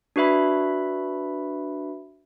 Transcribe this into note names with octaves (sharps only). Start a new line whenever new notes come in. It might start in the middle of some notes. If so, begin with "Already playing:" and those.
D4 F#4 B4 E5 B5